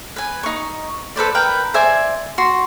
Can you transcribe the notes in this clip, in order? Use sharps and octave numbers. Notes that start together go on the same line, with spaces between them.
B4 G#5
D#4 C#6
A4 B4 C5 D5
A#4 B4 G5
C5 D5 E5 G#5
F#4 C6